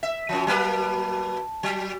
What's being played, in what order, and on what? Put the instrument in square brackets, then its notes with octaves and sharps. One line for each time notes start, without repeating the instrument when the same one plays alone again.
[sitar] E5
[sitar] F#2 F3 [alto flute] A5
[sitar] F#3 A#3 B4
F#3